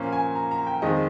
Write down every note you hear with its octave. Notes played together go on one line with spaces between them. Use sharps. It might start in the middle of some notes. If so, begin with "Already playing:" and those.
Already playing: A#2 F3 A#3 C#4 F5
G#5
A#5
A#5
G5
F2 D#3 G#3 C4 D#5